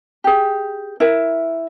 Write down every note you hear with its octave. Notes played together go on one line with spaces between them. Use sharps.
G4 G#4
E4 A#4 E5